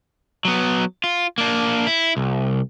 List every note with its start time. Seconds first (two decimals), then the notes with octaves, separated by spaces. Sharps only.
0.45 F#3 B3
1.04 F4
1.38 A#3 D4
1.87 E4
2.17 C2